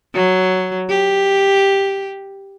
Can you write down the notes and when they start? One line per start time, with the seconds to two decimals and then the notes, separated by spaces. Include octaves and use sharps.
0.14 F#3
0.89 G4